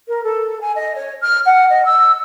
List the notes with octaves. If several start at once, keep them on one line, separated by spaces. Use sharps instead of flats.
A#4
A4
G#5
D#5
C#5
F6
F#5
D#5
E6